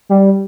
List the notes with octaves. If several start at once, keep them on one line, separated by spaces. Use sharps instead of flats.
G3